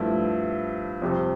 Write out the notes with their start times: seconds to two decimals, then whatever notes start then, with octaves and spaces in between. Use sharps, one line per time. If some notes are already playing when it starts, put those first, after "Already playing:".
Already playing: G2 F3 A3 E4
1.02 F2 C3 G3